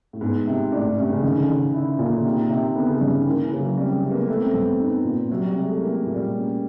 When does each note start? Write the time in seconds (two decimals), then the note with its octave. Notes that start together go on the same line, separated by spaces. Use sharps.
0.13 A2
0.21 G#2 B3
0.47 C3
0.72 A2 D4
0.85 G#2
0.98 G2 C3
1.11 C#3
1.23 D3 D#3
1.30 C#3
1.38 D3
1.49 D#3
1.74 E4
1.98 A#2 C#3
2.12 D3
2.25 C3 D#3
2.50 C3
2.75 D3 B3
2.89 C#3
3.01 G2 G3
3.13 D#3
3.26 E3 A#3
3.44 E3
3.52 C#3
3.60 F#3
3.77 G3 C4
3.94 G#3
4.03 C3 B3
4.11 A#3
4.28 A3 B3
4.41 C4
4.53 G2 B3
4.79 B3 D#4
5.04 A#2
5.30 C3 F#3
5.45 G3
5.56 C3 G#3
5.68 A3
5.80 A#3 E4
6.06 A#2
6.14 G3
6.32 C#4